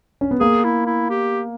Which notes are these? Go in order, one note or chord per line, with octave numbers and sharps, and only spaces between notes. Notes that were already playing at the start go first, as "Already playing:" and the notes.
C#4
B3
A#3 G#4
E4
E4
G4